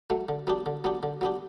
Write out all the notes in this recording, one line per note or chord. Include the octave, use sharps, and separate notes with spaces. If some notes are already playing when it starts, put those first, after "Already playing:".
F#3 A3
D3
F#3 B3 D4 G4
D3
F#3 B3 D4 G4
D3
F#3 B3 D4 G4